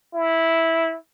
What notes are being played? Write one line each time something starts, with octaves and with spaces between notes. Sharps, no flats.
E4